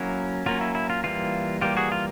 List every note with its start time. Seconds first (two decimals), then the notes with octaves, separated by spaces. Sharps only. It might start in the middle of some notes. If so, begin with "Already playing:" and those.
Already playing: F#3 A#3 C#4 E4
0.46 F#3 A#3 C#4 F4
0.61 E4
0.75 E4
0.90 F4
1.04 E3 G3 A#3 F4
1.61 E3 G3 A#3 F4 G4
1.77 F#4 G#4
1.92 F4